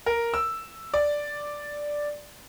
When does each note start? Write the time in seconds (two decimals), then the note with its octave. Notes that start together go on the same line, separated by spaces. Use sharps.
0.06 A#4
0.34 E6
0.94 D5